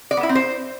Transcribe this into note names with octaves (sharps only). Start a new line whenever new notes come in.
D5
B3
E4
C4
C5